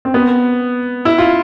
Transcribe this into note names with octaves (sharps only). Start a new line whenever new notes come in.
C4
B3
E4
F4